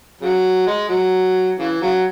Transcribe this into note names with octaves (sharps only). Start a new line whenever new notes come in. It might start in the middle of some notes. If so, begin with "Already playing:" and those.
C#3 F#3
G#3
F#3
C#3 E3
C#3 F#3